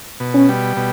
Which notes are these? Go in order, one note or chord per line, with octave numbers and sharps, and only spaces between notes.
B2
C#4
G3
B2